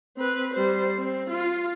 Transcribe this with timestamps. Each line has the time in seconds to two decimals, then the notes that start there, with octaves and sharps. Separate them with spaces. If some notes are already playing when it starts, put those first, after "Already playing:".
0.17 C4 B4
0.54 G3 C5
0.98 C4
1.30 F4